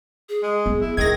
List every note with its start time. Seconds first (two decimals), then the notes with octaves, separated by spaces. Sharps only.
0.29 G#4
0.43 G#3
0.66 B3
0.81 E4
0.97 D#3 E4 G#4 G#6 A#6